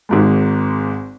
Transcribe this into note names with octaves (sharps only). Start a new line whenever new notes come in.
G#1 G#2 G#3